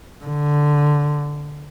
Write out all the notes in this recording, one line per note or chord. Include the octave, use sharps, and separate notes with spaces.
D3